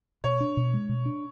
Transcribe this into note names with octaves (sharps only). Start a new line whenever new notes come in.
B2 C#5
D4
B2
G#3
B2
D4